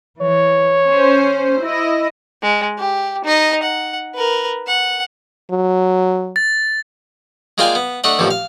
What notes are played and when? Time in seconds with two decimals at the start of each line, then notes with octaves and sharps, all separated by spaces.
0.22 E3 C#5
0.88 C#4 C5
1.61 E4 D#5
2.42 G#3
2.78 G4
3.25 D#4 D#5
3.63 F#5
4.15 A#4 B4
4.67 F#5
5.51 F#3
6.36 A6
7.58 G#3 A#3 F4 D5 G5 G#5
7.75 B3
8.04 A3 D4 D#5 F#5
8.19 A1 D#2 D3 F3
8.31 F5